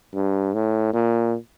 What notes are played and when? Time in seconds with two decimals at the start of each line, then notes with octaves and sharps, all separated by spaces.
0.14 G2
0.54 A2
0.94 A#2